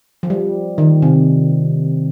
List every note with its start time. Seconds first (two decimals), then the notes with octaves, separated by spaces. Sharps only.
0.23 F3
0.30 G3
0.78 D#3
1.02 C3